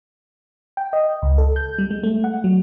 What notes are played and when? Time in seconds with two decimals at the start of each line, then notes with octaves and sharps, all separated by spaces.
0.77 G5
0.93 D#5
1.22 C#2
1.38 A4
1.56 G6
1.78 G3
1.91 G#3
2.03 A3
2.24 F#5
2.44 F#3